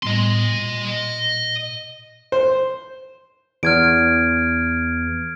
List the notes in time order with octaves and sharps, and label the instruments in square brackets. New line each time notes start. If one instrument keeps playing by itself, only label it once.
[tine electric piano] A2 G3 B3 [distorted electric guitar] D#5 C6
[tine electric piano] A#2
[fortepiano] C5
[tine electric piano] E2 [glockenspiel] F6 G#6 D7